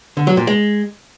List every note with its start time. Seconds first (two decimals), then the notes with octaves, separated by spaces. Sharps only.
0.17 D3
0.27 F#3
0.37 A#2
0.47 G#3